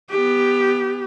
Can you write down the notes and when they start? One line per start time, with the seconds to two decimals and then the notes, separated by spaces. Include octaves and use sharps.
0.10 B3 G4